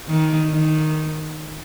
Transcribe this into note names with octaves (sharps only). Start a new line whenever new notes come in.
D#3
D#3